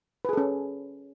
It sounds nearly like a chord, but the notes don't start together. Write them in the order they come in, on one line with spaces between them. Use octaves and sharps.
B4 G#4 A4 C#4